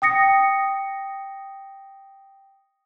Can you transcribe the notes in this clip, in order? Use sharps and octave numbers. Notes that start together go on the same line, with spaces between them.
G5 D#6 A#6 C#7